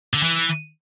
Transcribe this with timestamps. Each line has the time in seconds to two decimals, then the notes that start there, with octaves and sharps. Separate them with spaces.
0.14 D3
0.23 E3